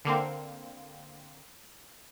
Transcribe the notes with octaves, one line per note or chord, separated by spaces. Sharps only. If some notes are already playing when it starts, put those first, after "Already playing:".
D3 A#3 C4